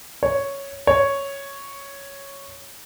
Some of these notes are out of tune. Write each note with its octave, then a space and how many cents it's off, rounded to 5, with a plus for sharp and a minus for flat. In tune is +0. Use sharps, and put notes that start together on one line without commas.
C#5 +0
C#5 +0